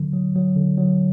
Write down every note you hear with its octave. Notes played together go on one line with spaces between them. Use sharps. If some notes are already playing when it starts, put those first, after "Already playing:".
Already playing: D3 F#3
F#3
F#3
D3
F#3